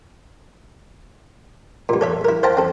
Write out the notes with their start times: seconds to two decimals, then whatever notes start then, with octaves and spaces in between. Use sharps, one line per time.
1.89 G2 A#2
2.01 A4 C#5 E5
2.25 E4 A#4
2.43 C5 F5 G5 A5 A#5
2.57 C4 A4